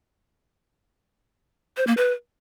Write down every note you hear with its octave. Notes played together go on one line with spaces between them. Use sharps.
C5
A#3
B4